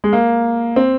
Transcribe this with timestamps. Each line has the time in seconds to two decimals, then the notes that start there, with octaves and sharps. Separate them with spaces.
0.04 G#3
0.13 A#3
0.76 C4